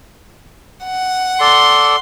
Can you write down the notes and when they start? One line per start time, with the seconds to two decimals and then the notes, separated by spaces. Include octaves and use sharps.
0.85 F#5
1.41 A4 D5 C6